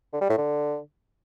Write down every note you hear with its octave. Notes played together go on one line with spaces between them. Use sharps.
D3
G3
A2
D3